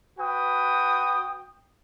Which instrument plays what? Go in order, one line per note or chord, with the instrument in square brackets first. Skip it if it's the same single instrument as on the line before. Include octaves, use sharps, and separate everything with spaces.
[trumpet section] F#4 B4 G5 D#6